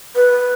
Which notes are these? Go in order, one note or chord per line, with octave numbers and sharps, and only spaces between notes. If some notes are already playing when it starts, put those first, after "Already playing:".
B4